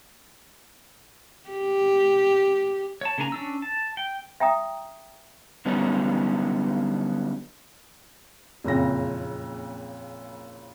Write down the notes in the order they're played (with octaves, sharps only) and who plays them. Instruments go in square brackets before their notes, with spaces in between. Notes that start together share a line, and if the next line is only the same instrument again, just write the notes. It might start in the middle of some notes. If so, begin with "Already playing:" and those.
[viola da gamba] G4
[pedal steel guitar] C#5 A5
C#3 A#3 D4 G#5 A#5
C#4 D4 E6
A5
G5
[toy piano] E5 G5 A#5 D#6
[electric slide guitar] D3 F#3 G3 B3 C#4 D#4
[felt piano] F#1 F2 A#2 C#3 A#6